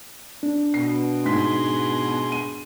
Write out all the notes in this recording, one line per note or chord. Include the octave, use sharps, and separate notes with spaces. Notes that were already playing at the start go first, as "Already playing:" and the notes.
D4
B2 C7
G#2 D#4 G#4 C6 B6
D#7